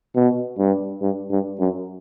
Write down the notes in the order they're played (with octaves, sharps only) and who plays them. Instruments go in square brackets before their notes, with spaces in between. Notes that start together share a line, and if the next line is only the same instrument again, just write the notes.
[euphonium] B2
G2
G2
G2
F#2